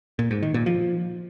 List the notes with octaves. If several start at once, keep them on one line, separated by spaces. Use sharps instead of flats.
A#2
G#2
D#3
A#2
F3